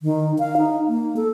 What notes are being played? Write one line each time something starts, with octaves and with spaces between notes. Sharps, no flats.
D#3
F5
D#4
A#3
A4